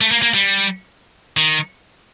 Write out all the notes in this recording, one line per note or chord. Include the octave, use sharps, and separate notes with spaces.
A3
A#3
A#3
G3
D#3